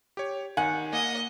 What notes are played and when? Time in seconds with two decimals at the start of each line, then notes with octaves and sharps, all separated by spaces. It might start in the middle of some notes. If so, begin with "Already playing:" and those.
0.17 G4 C#5
0.57 D#3 F#5 G#5
0.93 A#3 D#5